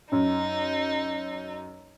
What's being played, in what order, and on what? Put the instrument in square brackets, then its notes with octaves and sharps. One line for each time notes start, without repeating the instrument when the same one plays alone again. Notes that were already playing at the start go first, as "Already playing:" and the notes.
[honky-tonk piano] F#2 [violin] D#4